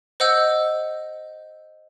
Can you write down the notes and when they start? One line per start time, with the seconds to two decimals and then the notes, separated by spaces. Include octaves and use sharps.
0.20 C5 D#5 F#5 E6 G6